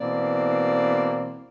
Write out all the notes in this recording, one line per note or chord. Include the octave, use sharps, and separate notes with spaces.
B2 E3 A#3 C4 D5